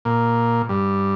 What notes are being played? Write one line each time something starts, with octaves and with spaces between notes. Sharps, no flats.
A#2
G2